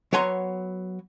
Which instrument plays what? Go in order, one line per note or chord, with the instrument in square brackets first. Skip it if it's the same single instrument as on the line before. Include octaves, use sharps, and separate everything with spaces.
[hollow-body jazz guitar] F#3 B3 C#5 G#5 A#5 C6